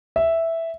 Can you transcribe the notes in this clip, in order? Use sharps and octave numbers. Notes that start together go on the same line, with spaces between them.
E5